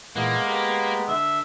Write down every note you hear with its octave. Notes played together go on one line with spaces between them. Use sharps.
A#2 E3 G#3 A#3 B3 F#6
G4 A#4 B4
D3 E5